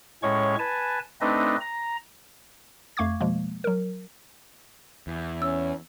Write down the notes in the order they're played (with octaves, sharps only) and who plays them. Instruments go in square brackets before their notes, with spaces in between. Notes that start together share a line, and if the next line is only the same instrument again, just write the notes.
[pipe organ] A2 G#3 C#4 C#5 C#6
B4 G#5 A5
A3 C4 D4 D#4 B4 D#5
A#5
[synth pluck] F2 A3 F5 C#6 D6 G#6
B2 F3 G#3 A#3
F#3 A#4
[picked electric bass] E2
[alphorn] C#4 [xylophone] E6